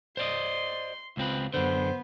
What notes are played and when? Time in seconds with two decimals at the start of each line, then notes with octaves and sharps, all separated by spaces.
0.17 C5 D5 D#5 C6
1.17 C#2 F3 C4 B4
1.54 F#2 D3 B3 C5